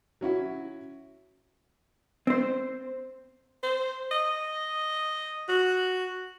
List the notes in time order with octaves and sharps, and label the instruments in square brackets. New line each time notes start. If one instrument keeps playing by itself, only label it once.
[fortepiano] F#3 C#4 E4 F#4
[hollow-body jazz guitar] C4 C5
[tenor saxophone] C5
D#5
F#4